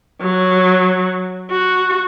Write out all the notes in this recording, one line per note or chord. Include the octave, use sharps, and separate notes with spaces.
F#3
F#4